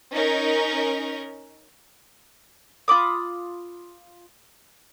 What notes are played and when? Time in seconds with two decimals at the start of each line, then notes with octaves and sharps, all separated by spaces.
0.12 C#4 D#4 A#4
2.88 F4 B5 D6 D#6